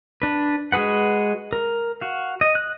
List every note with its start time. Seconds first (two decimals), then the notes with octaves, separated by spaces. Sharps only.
0.22 D4 B4
0.72 G#3 F#4 G#4 B4 F#5
1.53 A#4
2.01 F#4 F5
2.41 D#5
2.55 F#6